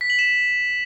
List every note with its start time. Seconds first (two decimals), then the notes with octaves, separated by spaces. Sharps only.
0.01 B6
0.10 F#7
0.19 E7